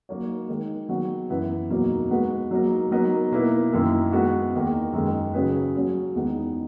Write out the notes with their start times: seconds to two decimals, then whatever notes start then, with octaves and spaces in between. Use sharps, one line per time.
0.09 F#3 A#3 D#4 F#4 C#5
0.48 D#3 G#3 D#4 A#4
0.89 D#3 F#3 B3 F#4
1.30 F#2 E3 B3 E4 B4
1.70 E2 B2 F#3 A#3 D#4
2.11 G#3 B3 F#4 B4
2.51 F#3 A#3 D#4 A#4
2.91 F#3 B3 D#4 A#4 D#5
3.31 B2 A#3 E4 B4
3.72 F#2 D#3 A#3 E4
4.12 G#3 B3 F#4
4.53 E2 D#3 A#3
4.93 F#2 D#3 G#3
5.34 C#3 F#3 C#4 G#4 B4
5.75 F#3 C#4 G#4
6.15 E2 D#3 G#3 B3 D#4